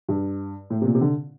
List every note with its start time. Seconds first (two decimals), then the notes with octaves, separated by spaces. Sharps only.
0.09 G2
0.70 A2
0.82 C3
0.85 A#2
0.95 C3
1.01 D3